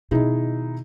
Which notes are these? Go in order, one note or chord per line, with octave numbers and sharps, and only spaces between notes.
B2 D#3 D#4 E4 G#4